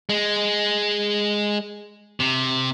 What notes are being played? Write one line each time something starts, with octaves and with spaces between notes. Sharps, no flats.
G#3
C3